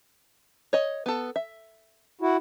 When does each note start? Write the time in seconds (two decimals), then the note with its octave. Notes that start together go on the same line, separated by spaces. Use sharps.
0.73 C#5 D#5
1.06 B3 A4
1.36 E5
2.21 E4 F#4